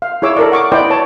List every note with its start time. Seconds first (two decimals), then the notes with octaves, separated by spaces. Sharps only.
0.02 F5
0.22 E4 G#4 C#5 D6 E6
0.37 A4 A#4 D5
0.52 F#5 C#6 D6
0.72 E4 B4 C5 D5 D#5 G5
0.90 C#5 A5